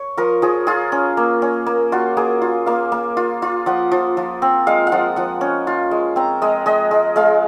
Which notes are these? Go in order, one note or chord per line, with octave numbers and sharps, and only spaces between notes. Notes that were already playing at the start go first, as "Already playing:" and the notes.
Already playing: C#5
F3 A#4
F3 G#4
F4 G#4
C#4
A#3
C#4
A#3
F4 F#4
A#3 G#4
F4
A#3 F5
A#3
F4
F4
F3 F#5
F3
F3
C4
G#3 F5
F5
F3 F#5
F3 F#5
C#4
F4
G#3
C4 A#5
G#3 D#5
G#3 D#5
G#3
G#3 F5